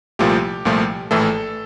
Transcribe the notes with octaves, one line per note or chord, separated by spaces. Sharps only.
C2 A#2 F3 A3 G4
C2 A#2 F3 A3
A#1 A2 E3 A3 A4